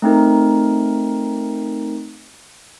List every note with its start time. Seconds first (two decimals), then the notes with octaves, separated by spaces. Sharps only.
0.02 A3 C4 D#4 A#4